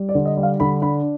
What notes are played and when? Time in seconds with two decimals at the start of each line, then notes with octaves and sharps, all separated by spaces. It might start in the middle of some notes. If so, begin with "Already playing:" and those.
Already playing: G3
0.09 D5
0.15 D3
0.25 D#5
0.37 G3
0.43 F5
0.60 D3 B5
0.82 D4 B5